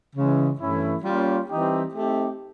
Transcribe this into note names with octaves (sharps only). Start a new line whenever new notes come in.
C#3 E3 G#3
G2 E3 A3 C#4 E4
G3 A#3 C#4 F4
E3 G3 C4 D#4 G4
A3 C4 D#4 G4